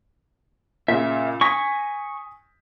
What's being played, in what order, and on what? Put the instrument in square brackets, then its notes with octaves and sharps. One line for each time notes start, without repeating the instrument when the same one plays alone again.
[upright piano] A#2 C#3 [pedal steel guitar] E5
[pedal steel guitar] G#5 C#6 [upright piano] D#6 A#6 B6